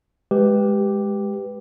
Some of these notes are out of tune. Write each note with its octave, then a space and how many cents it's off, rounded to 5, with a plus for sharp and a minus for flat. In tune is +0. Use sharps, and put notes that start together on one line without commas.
G#3 +0 G4 +0 B4 +0